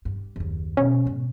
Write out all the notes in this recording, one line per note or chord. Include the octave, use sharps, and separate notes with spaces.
G2
F#1 D#2
B2 D3 C#4
G#2 B2